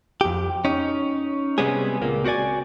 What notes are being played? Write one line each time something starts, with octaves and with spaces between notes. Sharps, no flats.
F2 G4
C#4 D#4
C3 G3 G#3 B3 C#4 G#4
C#2 A#2 A#3
C4 F#4 A#4 D5 G#5